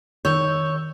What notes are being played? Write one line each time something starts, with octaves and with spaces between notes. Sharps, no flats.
D#3 C#5 E6 G6